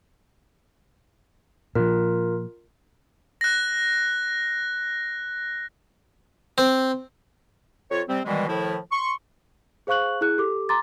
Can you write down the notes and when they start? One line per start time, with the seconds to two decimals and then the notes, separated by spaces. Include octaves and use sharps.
1.75 A#2 F3 F4 A#4
3.41 F#6 A#6
6.58 C4
7.90 F2 F4 C#5
8.08 C3 G3 C4
8.25 B2 D#3 E3 G3 G#3
8.48 A2 D#3 F3 E4
8.91 C6 C#6
9.87 G#4 C5 F5 C#6 F#6 F#7
10.21 E4 G#4 F#6
10.38 G4 A4 D6
10.69 A#5 C6 D6 A6